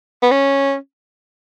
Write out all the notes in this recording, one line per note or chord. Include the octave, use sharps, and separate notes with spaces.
B3
C#4